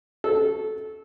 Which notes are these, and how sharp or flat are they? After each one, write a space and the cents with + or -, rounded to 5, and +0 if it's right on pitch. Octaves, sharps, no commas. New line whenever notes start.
F#4 +0 A4 -20